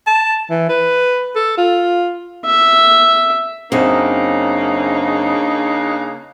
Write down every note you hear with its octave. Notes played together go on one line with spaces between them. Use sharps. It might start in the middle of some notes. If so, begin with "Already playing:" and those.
A5
E3
B4
A4
F4
E5
F#2 C#3 A#3 C4 D4 D#4